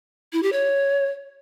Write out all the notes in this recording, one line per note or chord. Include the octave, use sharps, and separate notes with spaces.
E4
G4
C#5